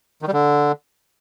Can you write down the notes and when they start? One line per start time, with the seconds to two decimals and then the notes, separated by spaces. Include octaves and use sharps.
0.22 D#3
0.28 G3
0.33 D3